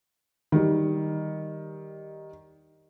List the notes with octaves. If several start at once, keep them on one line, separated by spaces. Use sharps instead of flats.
D#3 G3